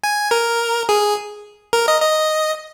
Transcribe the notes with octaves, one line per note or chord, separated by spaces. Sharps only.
G#5
A#4
G#4
A#4
D#5
D#5